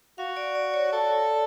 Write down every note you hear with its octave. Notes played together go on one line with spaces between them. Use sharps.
F#4 F5
D5
D5
C#5
A4